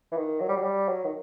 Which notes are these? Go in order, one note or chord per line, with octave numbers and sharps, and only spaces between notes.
E3
D#3
F#3
G3
F#3
G3
F#3
D#3